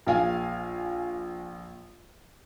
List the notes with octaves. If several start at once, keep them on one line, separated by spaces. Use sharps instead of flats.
A#1 F5 G#5